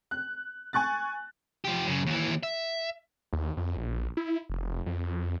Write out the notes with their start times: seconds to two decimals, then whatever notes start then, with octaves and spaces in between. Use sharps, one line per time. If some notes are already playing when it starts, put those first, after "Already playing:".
0.11 F#6
0.73 G#5 C#6 F#6 A6
1.65 F3 G4
1.87 F#2 C#3
2.06 D#2 E3
2.43 E5
3.33 D#2
3.57 F2
3.77 A#1
4.17 E4
4.50 F1
4.86 F2